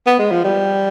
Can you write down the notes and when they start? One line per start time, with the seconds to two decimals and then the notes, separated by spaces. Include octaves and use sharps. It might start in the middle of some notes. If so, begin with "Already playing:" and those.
0.06 B3
0.19 G#3
0.31 F3
0.45 G3